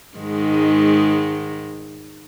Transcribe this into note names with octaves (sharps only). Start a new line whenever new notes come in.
G#2 D#3 G#3